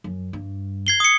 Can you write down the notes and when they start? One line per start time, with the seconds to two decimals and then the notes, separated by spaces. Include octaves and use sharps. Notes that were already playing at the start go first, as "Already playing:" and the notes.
0.04 F#2
0.33 G2
0.87 G#6 C7 G7
1.00 D#6 C#7